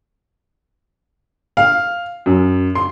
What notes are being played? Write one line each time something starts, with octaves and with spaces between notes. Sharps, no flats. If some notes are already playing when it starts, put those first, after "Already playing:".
F5
F#2
C6